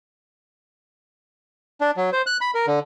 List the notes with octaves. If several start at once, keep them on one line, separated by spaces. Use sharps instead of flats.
D4
F#3
C5
F#6
B5
A#4
D3